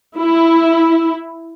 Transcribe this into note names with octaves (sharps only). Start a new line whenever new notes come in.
E4